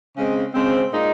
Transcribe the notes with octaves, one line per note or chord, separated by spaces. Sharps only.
C#3 G#3 C4
C#3 G#3 C4
A#2 G#3 D#4